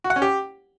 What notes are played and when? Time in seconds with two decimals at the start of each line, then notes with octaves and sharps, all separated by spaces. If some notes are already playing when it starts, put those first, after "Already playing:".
0.04 F#4
0.10 F#5
0.16 C#4
0.22 G4